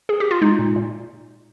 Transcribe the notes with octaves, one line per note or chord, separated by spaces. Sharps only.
G#4
G4
F4
G#3 D#4
A#2
A#2